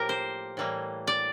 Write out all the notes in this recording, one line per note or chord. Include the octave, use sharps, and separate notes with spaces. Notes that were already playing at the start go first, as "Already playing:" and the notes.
Already playing: A2 F3 A#3 G4 A#4
C5
A2 E3 G3 A#3
D5